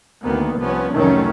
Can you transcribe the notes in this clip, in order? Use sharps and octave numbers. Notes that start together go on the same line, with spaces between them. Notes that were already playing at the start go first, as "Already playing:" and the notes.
D2 D#3 A#3 B3
C2 F3 B3 C#4
C2 F2 D#3 F#3 A3 C#4